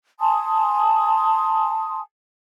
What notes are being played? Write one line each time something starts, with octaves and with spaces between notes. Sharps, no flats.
G#5 A5 C6 D#6